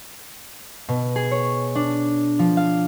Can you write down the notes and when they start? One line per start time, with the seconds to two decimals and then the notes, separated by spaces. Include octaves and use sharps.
0.89 B2
1.16 G#4
1.31 C#5
1.75 D4
2.39 F3
2.57 F5